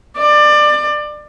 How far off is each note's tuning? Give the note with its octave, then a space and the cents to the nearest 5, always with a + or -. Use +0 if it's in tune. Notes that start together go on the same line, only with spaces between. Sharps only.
D5 +25